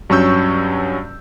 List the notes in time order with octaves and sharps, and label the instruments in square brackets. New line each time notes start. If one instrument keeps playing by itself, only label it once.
[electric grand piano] G2 F#3 C#4 C#6 E6 G6